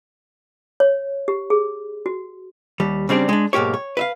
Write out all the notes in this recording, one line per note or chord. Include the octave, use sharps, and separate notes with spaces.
C#5
G4
G#4
F#4
D#2 G3
C#3 G3 C4 D4 D5
G#3 D4
B1 G#2 A#3 G4 C#5
C#5
B4 E5 F5